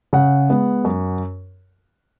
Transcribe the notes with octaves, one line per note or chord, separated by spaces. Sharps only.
C#3 F#5
G#3 B3
F#2